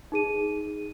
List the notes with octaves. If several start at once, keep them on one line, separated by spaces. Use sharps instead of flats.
D#4 G#4 D#7